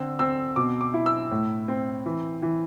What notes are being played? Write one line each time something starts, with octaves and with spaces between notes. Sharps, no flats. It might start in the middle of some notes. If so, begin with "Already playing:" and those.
Already playing: D3 C4 E6
C4 E6
B2 D6
D6
E4
E6
A2
C4
E3
E3